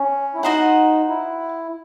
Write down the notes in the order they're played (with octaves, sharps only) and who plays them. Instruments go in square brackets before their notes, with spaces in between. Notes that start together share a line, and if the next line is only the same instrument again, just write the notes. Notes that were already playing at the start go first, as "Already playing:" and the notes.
Already playing: [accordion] C#4
E4
[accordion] D#4 [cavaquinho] F#4 C5 D#5 F#5
[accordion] E4